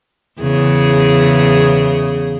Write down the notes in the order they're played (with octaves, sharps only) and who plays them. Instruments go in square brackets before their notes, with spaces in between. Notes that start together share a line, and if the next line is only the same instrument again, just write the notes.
[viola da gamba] E2 C#3 G#4